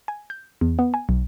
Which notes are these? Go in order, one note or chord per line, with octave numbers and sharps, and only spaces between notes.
G#5
G6
E2
B3
G#5
B1